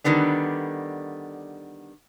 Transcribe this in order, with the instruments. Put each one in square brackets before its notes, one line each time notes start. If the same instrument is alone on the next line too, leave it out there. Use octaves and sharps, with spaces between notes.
[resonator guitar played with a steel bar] D3 D#3 G3 B3 D4